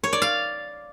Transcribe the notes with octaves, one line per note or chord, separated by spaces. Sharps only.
C#5
D5
F5